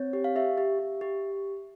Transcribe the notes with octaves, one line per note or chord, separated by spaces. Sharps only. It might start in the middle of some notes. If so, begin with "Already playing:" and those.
Already playing: C4 C#5
G4
F5
G4 E5
G4
G4
G4